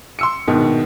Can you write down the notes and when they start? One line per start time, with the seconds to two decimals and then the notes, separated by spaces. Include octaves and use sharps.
0.19 C6 E6 C#7
0.48 A#1 G#2 B2 D#3